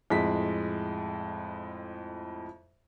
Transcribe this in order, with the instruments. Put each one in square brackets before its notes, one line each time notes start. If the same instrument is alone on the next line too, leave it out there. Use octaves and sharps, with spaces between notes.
[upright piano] F2 A2 G#3 B6